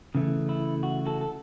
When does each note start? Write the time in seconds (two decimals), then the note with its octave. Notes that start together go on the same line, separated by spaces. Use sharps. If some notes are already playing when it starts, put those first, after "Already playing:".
0.15 C#3 E3 A3
0.49 E4
0.83 F#4
1.06 F#4 A4
1.21 A4